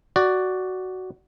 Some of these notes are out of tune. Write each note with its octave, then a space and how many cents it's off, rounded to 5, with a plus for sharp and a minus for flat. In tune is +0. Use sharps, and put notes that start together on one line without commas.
F#4 +10 D5 +5